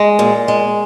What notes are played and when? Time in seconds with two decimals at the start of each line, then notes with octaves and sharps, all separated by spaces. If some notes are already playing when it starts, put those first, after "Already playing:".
Already playing: G#3
0.19 A#2
0.48 G#3